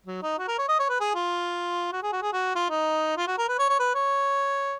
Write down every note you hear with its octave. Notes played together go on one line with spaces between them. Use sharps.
F#3
D#4
F#4
A#4
C#5
D#5
C#5
B4
G#4
F4
F#4
G#4
F#4
G#4
F#4
F4
D#4
F4
F#4
A#4
B4
C#5
C#5
B4
C#5